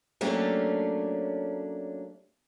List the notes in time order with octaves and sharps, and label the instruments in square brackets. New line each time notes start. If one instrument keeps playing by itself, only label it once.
[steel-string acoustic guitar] F#3 A3 A#3 C#4 D4 G4